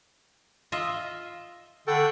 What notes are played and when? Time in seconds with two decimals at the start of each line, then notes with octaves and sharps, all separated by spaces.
0.72 F4 D#5 E5
1.87 D3 A4 F#5 G5 C#6